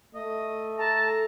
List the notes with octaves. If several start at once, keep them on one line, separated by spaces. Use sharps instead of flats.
A3 D#5
A4 A5 A#5